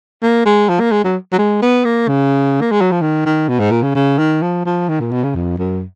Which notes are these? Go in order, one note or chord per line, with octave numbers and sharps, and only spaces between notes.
A#3
G#3
F3
A#3
G#3
F#3
F#3
G#3
B3
A#3
C#3
A#3
G#3
F#3
F3
D#3
D#3
B2
G#2
A#2
C#3
C#3
D#3
F3
F3
D#3
A#2
B2
C#3
F2
F#2